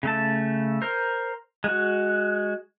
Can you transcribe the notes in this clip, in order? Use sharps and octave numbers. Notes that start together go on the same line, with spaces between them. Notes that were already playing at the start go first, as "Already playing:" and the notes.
C#3 A3 A5
A#4 C5
G#3 F#4